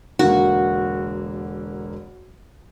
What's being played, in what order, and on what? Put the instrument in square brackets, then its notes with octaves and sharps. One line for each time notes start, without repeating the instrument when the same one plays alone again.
[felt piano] E1 D3 A#3 [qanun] F#4